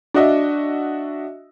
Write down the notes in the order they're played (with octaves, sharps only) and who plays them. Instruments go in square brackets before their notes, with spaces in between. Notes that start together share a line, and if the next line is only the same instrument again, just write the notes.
[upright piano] D4 F#4 D#5 E5